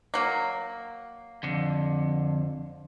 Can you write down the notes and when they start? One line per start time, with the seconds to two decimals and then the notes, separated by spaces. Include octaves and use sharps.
0.14 F#3 A#3
1.43 F2 D3